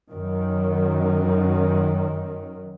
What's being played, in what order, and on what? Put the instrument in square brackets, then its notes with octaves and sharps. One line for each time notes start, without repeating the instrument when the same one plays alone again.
[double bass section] F#2 D#3 F#3